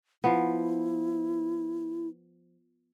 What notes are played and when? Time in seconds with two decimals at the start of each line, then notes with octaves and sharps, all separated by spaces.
0.24 F3 B3 E4